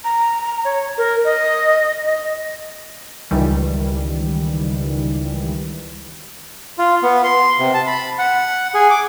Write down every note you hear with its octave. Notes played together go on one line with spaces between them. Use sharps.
A#5
C#5
A#4
D#5
D#5
C#2 D#3 E3 G3
F4
B3
C6
C3
A5
B5
F#5
G#4
D6